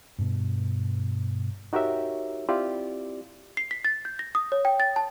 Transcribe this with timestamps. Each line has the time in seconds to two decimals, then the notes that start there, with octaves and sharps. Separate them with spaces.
0.18 G2 B2
1.73 D#4 F#4 G4 A#4 C#5 E5
2.48 C4 E4 F4 G4 D5
3.57 C7
3.71 B6
3.85 A6
4.05 G6
4.19 A#6
4.35 D#6
4.52 C#5
4.65 G5
4.80 A6
4.96 A5